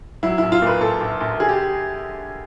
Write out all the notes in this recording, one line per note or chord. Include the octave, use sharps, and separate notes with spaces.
F#3 E4
A#1 E4
F4
A#2 B4
A#2 A4
A#1
A#1
D3 G#4
G4